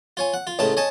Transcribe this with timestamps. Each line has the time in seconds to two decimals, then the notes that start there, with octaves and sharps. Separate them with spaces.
0.17 F4 C#5 G#5
0.34 F#5
0.47 F4
0.59 C#2 A2 A3 D#4 A5
0.77 C#5 D#5 G#5 A5